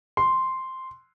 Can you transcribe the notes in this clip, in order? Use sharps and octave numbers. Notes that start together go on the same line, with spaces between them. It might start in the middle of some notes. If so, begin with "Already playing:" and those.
C6